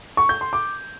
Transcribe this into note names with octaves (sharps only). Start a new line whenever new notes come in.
C#6
G6
C6
D6